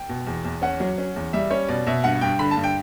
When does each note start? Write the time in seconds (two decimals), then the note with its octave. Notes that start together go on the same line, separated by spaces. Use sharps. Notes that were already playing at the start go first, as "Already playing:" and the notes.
Already playing: G5
0.09 B2
0.27 E2
0.45 E2
0.62 C#4 F#5
0.80 F#3
0.98 C#4
1.16 E2
1.33 G3 E5
1.50 C#4 C#5
1.68 B2 D5
1.86 B2 E5
2.04 G2 F#5
2.21 G2 G5
2.39 D3 B5
2.51 A5
2.57 G2
2.64 G5